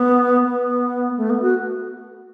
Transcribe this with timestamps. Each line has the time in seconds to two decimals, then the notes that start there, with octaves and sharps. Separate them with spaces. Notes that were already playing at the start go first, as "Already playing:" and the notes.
Already playing: B3
0.44 B3
1.17 A3
1.30 B3
1.42 F#4